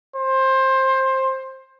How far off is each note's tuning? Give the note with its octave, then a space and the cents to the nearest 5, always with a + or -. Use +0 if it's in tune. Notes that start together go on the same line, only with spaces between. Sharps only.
C5 +20